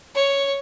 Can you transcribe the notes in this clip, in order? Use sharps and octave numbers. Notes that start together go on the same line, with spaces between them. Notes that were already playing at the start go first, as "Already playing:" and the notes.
C#5